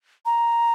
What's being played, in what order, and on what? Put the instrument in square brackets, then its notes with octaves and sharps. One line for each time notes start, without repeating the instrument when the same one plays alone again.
[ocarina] A#5